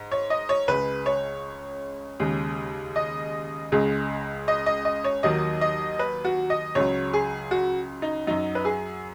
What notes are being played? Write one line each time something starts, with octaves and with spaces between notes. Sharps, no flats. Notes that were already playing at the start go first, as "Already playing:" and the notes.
Already playing: G#2
C#5
D#5
C#5
C#2 C#3 G#3 B4
C#5
D#2 C#3 G#3
D#5
C#2 C#3 G#3
D#5
D#5
D#5
C#5
D#2 D#3 F#3 D#5
D#5
B4
F#4
D#5
C#2 C#3 F#3 C#5
G#4
F#4
D#4
F#2 F#3 D#4
B4
G#4